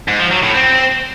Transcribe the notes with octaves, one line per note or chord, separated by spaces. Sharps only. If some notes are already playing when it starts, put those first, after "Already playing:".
G#2
F3
F#3
A2
C4